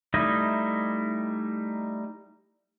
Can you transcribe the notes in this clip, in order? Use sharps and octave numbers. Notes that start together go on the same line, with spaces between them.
G3 A3 D#4 E4 D#5